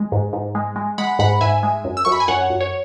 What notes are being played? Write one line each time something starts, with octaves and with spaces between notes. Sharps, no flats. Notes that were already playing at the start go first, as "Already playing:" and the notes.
Already playing: G#3
G#2
G#2
G#3
G#3
G#3 F#5 B5
G#2 F#5 B5
G#2 E5 G#5
G#3
F#2
E6
F#2 C#6
B5
G#5
F#2 C#5 F#5
F#2
C#5